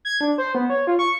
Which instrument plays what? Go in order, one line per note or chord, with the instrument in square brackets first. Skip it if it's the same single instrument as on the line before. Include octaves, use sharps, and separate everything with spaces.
[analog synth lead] G#6
D4
C5
B3
C#5
F4
C#6